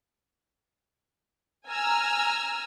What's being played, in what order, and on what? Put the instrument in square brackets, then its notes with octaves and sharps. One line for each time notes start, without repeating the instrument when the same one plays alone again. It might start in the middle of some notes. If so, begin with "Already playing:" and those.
[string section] G#5 A#5 E6 F6